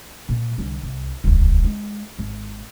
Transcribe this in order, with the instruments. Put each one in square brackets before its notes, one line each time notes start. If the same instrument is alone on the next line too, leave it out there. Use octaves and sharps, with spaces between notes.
[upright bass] A#2
C2 D3
C2
D#1 C#2
G#3
G#1